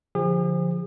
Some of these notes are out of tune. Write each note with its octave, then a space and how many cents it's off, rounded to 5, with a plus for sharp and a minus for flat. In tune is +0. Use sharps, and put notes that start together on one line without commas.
D3 -20 F3 +0 G#4 -45